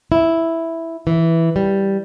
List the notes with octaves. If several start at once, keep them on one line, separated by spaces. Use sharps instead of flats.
E4
E3
G3